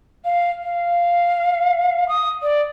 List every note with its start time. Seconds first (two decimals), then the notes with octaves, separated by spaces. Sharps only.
0.25 F5
0.63 F5
2.09 D#6
2.42 D5